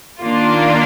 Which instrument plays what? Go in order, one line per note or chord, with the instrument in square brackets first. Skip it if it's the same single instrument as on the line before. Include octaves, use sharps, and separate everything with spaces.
[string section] D#3 A#3 D4 F4